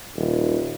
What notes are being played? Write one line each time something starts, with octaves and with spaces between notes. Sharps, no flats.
D#1